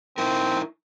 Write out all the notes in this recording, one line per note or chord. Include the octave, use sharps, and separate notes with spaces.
C4 D#4 E4 A#4